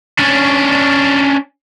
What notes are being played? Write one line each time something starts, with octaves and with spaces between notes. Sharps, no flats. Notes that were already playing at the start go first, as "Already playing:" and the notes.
C#4 D4